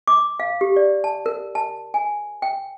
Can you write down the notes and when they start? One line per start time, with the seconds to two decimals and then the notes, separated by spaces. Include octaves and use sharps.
0.07 D6
0.40 F5
0.61 G4
0.76 D5
1.04 A5
1.26 A#4
1.55 A5
1.94 G#5
2.42 G5